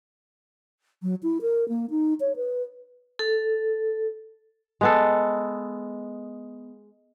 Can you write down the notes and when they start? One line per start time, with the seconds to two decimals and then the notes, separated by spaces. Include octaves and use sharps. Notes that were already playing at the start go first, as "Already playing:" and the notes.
1.03 F#3
1.23 E4
1.42 A#4
1.69 A#3
1.90 D#4
2.20 C#5
2.36 B4
3.19 A4
4.81 G#3 B3 A4